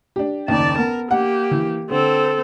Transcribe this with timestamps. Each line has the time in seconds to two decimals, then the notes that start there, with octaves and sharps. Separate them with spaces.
0.16 D4 G4
0.48 F#1 D#2 D5 A5
0.78 B3 A#4
1.11 A#3 G4 F#5
1.51 E3
1.90 D3 C4 A4